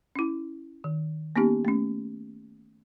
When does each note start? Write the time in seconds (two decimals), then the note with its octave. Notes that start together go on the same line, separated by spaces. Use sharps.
0.15 C#4 E4
0.84 D#3
1.36 A#3 B3 C#4 D#4 G4
1.65 A3 C#4